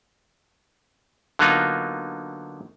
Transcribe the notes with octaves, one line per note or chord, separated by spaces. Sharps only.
D3 F#3 A#3 B3 D#4 F4